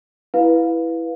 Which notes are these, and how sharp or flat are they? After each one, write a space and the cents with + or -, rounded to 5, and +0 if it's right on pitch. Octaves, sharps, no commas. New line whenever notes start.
E4 +0 B4 +0 F5 +15